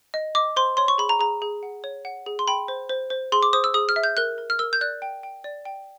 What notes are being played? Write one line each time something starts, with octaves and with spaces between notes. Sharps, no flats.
D#5
D#5 D6
C5 C6
C#5 C6
C#6
G#4 B5
A#5
G#4 A#5
G#4
F#5
C#5
F#5
G#4
C6
G5 B5
C5
C5
C5
G#4 C6
D6
C5 D#6
E6
G#4 D#6
F6
E5
G6
A#4 F#6
A#4
F6
A#4 E6
G6
D5 F#6
G5
G5
D5
G5